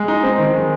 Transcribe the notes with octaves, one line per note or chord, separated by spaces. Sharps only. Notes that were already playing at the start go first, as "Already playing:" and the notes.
Already playing: G#3
D#4
C4
D#3
G#3